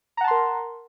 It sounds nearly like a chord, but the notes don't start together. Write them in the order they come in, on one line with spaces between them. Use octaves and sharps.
A#5 F#5 A5 C6 A#4